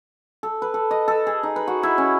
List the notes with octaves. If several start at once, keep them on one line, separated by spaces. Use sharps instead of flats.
A4
B4
A4
D#5
A4
G#4
D#4
B4
F#4
E4
C#4